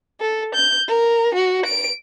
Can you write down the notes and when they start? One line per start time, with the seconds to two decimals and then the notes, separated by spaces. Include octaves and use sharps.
0.20 A4
0.55 G6
0.88 A#4
1.34 F#4
1.66 D7